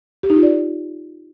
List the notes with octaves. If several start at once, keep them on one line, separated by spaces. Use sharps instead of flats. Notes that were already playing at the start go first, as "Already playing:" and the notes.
G4
D#4
F4
D5